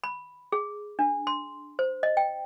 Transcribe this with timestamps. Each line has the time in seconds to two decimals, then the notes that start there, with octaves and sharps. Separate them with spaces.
0.04 B5
0.52 G#4
0.99 D4
1.27 C6
1.79 C5
2.03 D#5
2.17 G5